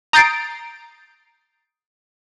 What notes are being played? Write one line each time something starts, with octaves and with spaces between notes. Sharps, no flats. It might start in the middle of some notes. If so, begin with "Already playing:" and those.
A#5 D#6 G6 A6 C7 D7